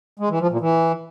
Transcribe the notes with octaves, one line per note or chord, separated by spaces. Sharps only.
G#3
E3
F3
A#2
E3